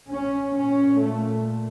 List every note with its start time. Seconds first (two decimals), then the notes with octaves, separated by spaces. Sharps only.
0.09 C#4
0.54 A#2 C#4
0.97 A3